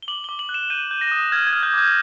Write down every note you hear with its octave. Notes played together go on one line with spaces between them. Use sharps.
G7
D6 F#7
G7
D6
F#7
F#6
E7
G6 D#7
G6
A#6
D#6
F6 G#6
G#6
F6
G6
D6 G6